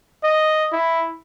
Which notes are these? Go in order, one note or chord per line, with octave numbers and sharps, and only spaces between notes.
D#5
E4